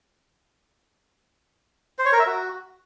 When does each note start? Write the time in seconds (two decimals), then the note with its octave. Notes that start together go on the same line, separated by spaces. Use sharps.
1.99 C5
2.06 C#5
2.13 A#4
2.19 E5
2.26 F#4